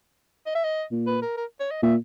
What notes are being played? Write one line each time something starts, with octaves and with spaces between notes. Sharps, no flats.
D#5
E5
D#5
A#2
B4
A#4
A#4
C#5
D#5
A#2 E5